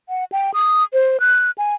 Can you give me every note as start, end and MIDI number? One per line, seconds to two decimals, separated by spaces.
0.09 0.24 78
0.32 0.51 79
0.54 0.84 87
0.93 1.20 72
1.20 1.51 90
1.58 1.75 80